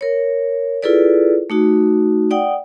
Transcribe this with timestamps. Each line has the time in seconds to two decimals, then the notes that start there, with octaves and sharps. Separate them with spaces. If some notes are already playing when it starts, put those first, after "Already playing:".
0.01 A#4 C#5
0.82 E4 F4 G#4 A4 B4 D5
1.50 A3 D#4 F#4
2.31 D5 F#5 G5 D#6